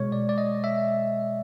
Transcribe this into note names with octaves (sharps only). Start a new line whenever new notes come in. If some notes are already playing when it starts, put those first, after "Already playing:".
Already playing: B2 G#3 C#5
D5
D5
D#5
E5